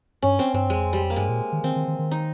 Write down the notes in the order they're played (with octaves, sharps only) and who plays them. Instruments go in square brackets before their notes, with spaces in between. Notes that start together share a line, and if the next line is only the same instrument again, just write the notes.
[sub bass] G2 [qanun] C#4
[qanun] C4
[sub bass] G2 [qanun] C4
[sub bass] F2 [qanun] G#3
[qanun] G3
A#3
[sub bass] G2 [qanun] G#3
[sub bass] A#2
D#3
[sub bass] D#3 [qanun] C4
[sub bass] D#3
D#3
D#3
[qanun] D#4